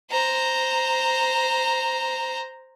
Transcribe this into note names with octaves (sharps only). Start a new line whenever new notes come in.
C5 A#5